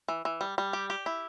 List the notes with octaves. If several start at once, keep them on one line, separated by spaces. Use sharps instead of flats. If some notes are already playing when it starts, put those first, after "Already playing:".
E3
E3
G3
G3
G4
G4
E4